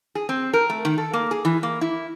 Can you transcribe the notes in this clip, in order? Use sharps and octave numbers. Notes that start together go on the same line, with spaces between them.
G#4
C4
A#4
A3
D#3
A4
A#3
G#4
E3
A#3
E4